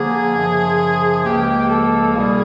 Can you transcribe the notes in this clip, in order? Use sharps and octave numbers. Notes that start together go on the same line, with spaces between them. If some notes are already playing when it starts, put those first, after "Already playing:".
Already playing: D3 F3 A#3 G#4
F#2 C#3 F3
C#2 C#3 F3 A#3 G4
A4
C2 B2 G3 A#3 G#4